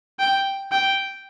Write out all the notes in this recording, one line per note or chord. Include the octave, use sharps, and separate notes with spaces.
G5
G5